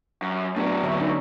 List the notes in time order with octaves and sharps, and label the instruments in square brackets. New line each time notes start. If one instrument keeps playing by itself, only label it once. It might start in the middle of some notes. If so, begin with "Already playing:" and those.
[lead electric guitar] F#2
[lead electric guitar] A2 F#3 [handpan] B3 D4
[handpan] D3 C#5 E5
C#4 D#4